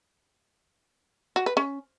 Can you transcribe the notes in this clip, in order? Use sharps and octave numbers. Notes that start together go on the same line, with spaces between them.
F#4
B4
C#4